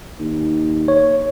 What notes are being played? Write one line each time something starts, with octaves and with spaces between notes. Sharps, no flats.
D#2
C#5